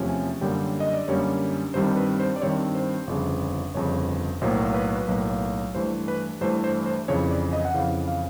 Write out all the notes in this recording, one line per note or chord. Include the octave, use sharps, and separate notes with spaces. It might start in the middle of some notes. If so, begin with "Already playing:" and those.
Already playing: E2 C3 F3 A3 C#4
G#5
F#2 D3 G3 A#3 C#4 G5
D#5
D5
F#2 D3 G3 A#3 C#4 C#5
G2 D#3 G3 C4 C5
B4
C5
D5
G2 D#3 G3 C4 C#5
C5
G1 F2 C#3
G1 F2 C#3 C#5
B1 A2 F#3 A#3 C5
B4
B4
B1 A2 F#3 A#3
G2 E3 A3 C5
B4
G2 E3 A3 C5
C5
C5
F2 C#3 E3 C#5
D5
D#5
F#5
F2 C#3 E3 F5
F5